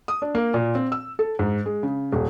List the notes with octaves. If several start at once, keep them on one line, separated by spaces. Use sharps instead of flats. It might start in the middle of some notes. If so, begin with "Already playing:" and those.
D#6
D4
A#3
A#2
C4
E6
A4
G#2
G#3
C#3
D#1